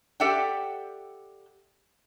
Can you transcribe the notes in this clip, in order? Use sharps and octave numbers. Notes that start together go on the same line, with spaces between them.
G4 A4 D5 E5 F#5 G5